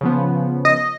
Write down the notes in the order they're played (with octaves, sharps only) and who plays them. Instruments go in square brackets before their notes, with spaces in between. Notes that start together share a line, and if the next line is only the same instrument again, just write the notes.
[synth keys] C#3 F3 B3
[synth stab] D#5